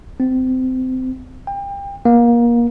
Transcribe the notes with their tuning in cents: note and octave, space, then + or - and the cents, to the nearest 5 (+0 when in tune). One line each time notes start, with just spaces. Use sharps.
C4 -25
G5 +30
A#3 +25